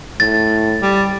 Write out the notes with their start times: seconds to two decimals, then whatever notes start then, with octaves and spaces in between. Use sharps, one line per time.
0.20 A2 A6
0.82 G3